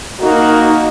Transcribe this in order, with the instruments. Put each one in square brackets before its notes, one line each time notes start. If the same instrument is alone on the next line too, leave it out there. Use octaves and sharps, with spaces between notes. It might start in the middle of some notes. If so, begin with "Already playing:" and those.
[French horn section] A#3 F#4 [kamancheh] D#4